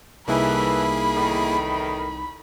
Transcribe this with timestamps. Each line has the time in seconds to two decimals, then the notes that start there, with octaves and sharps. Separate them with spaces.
0.28 C2 A2 E3 A#3 D#4 E4 G#4 B5
1.15 E2 A2 D#3